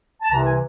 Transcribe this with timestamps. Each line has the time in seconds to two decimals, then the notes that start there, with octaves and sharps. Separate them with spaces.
0.22 A5
0.31 C2 C3 E3 A#5
0.45 G#5